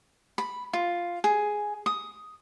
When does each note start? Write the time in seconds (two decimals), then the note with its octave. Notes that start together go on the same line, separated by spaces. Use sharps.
0.38 B5
0.73 F4
1.24 G#4
1.86 D#6